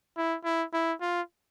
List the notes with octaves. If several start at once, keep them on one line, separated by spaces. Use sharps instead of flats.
E4
E4
E4
F4